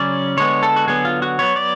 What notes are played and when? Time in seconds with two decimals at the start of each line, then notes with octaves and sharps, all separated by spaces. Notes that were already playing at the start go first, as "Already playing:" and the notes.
Already playing: C#3 F#3 C#4 D5
0.37 D3 G#3 B3 C#5
0.63 A4
0.76 F#4
0.88 D3 F#3 B3 G#4
1.05 F4
1.22 F#4
1.39 F#3 B3 C#5
1.56 D5